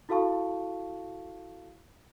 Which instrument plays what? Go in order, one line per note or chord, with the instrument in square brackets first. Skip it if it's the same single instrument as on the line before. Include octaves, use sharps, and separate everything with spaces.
[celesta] E4 F#4 A4 F5 A5 C#6